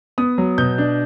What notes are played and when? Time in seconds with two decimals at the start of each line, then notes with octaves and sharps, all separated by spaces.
0.18 B3 D#6
0.38 F#3
0.58 B2 G6
0.78 D4